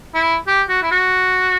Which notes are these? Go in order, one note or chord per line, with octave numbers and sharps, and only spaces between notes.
E4
G4
F#4
E4
F#4